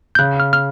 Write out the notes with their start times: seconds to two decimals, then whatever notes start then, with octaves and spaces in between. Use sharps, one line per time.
0.15 G6
0.19 C#3 F#6
0.40 F6
0.53 F6